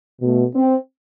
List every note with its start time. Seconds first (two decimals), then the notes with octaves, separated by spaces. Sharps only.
0.21 B2 A3
0.55 C4